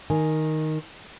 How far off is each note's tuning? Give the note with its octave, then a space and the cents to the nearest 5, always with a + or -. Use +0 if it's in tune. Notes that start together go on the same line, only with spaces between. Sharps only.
D#3 +0 G#5 +0